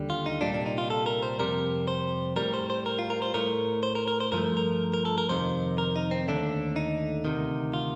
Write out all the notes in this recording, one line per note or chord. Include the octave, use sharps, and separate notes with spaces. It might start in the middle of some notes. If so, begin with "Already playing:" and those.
Already playing: D#2 D3 G3
F4
D#4
C2 A#2 G3 D4
D4
D#4
F4
A4
A#4
C5
F2 C3 G3 A#4
C5
A2 G3 A#4
C5
C5
A#4
F4
A#4
C5
A2 A3 A#4
C5
A#4
A#4
C5
G2 F3 A3 A#4
A#4
A#4
A4
A#4
F2 C3 D#3 C5
A#4
D#4
C4
D#2 D3 A3 D4
D#4
D2 C3 D#3
F4